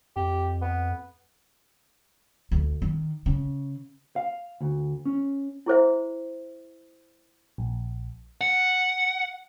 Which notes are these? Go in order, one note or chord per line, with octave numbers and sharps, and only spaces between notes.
F2 G4
B3
D2
D#3
C#3
F5
D2
C#4
E4 G#4 C5 E5
A#1
F#5